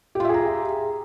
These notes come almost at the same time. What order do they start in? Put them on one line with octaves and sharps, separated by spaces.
G4 F4 E5 G#4 A#5